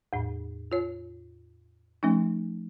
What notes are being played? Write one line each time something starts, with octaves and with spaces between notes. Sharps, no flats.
E2 A2
F4 C#5
F3 A3 C#4 D#4